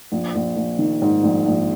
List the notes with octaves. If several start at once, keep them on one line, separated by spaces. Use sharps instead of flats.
A#1
A#1
A#1
D#3
G#2
A#1
A#1